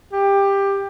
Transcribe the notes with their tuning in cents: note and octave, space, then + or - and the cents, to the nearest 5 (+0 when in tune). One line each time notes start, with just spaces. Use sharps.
G4 +15